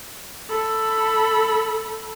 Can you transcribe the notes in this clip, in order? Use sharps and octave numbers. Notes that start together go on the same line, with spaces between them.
A4 B5